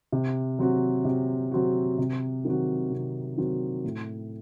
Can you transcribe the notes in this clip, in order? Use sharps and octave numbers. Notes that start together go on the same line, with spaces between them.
C3
F#3 C4 F#4
C3
F#3 C4 F#4
C3
D#3 F#3 C4 F#4
C3
D#3 F#3 C4 F#4
A2